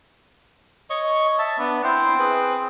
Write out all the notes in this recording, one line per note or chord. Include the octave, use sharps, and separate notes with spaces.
C#5 D#5 C#6
E5 A5
B3 D4
C4 E4 C5
G#4 B4